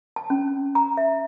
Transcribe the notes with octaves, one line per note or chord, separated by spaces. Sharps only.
A5
C#4
A#5
E5